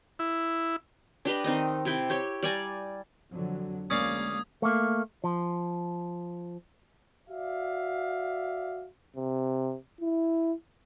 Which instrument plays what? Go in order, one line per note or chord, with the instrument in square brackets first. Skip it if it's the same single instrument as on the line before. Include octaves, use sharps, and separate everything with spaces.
[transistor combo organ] E4
[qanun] D4 G4 B4 D#5
D#3 C4 D#4 D#5
C3 E4 G5
G4 C#5 G5
G3 D5 G#5 A#5
[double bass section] F2 D3 F#3
[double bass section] D2 G#3 A#3 [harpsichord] C#4 D5 F5 [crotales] D#6 G#6
[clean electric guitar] A3 A#3
F3
[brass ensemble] F#4 D5 E5 F5
[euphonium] C3
E4